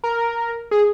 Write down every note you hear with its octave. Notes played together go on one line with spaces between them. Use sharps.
A#4
G#4